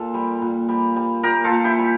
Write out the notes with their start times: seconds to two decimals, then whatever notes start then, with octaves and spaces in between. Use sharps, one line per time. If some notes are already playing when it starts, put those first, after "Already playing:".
Already playing: A#2 F4 A4
0.14 G3
0.42 A#2
0.69 G3
0.96 G3
1.23 A#2 G4 A#4
1.44 F4 A4
1.51 A#2
1.64 E4 G4
1.79 G3